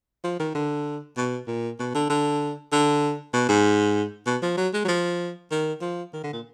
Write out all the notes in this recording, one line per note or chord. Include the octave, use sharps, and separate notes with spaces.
F3
D#3
D3
B2
A#2
B2
D3
D3
D3
B2
G#2
B2
F3
F#3
G#3
F#3
F3
D#3
F3
D#3
D3
A#2